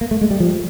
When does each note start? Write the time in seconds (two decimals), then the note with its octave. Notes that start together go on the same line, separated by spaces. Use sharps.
0.01 A#3
0.11 A3
0.21 G#3
0.31 G3
0.40 F3